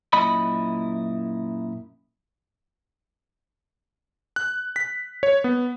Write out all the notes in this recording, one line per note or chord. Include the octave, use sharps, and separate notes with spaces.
F#2 A#2 E4 D#5 B5
F#6
B6
C#5
B3